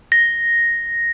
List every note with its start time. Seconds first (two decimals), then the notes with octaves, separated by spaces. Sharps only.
0.12 A#6